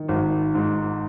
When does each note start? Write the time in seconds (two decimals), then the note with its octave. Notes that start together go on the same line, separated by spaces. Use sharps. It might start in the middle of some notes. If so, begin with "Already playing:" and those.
Already playing: D#3
0.08 G#1
0.55 G#2